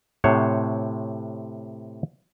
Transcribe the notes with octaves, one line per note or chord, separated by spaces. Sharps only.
A2 C3 C5 C#5 F#5